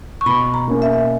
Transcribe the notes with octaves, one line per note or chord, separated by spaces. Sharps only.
C#6
B2 B5
A#5
A#3 C#4
E5